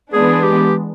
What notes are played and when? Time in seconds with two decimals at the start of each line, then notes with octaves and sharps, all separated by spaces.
0.13 E3 G#3 B3 D4 G#4
0.43 G4